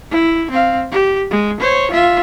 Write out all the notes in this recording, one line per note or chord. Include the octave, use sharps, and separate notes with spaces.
E4
C4 F5
G4
G#3
C5 C#5
F4 E5